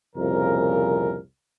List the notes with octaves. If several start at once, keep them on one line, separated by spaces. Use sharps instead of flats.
C2 F2 A#2 C#3 A#4